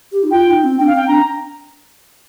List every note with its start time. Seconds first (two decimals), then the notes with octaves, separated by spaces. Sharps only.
0.12 G4
0.23 D#4
0.31 F4 G5
0.51 D#4
0.64 C4
0.78 D4 G5
0.87 F5
0.93 C4 G5
1.07 D4 A#5